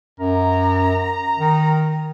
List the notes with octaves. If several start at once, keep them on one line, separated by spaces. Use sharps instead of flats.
F#2 A#5
D#3